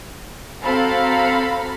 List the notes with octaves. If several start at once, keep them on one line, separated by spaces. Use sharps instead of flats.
C4 F#4 A4 F5 A#5 B5